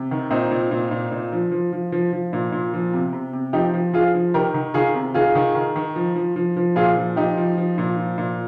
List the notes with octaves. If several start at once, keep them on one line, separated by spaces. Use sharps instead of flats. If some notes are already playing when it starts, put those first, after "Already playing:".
Already playing: C3
D#3
A#2 C4 D#4
A#2
A#2
A#2
A#2
F3
F3
F3
F3
F3
A#2
A#2
F3
C3
C3
C3
F3 D#4 G4
F3
F3 F4 G#4
F3
D#3 G4 A#4
D#3
D#3 F4 G#4
C3
D#3 F4 G#4
D#3
D#3
D#3
F3
F3
F3
F3
A#2 F4 G#4
F3
F3 D#4 G4
F3
F3
A#2
F3
A#2